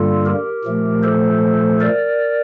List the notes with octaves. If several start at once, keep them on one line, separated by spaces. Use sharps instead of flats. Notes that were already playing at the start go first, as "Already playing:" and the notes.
Already playing: G2 D3 G3 A#3 F4 A4
G4 A#4
A#2 F3 A3
A4 C5
A#4 D5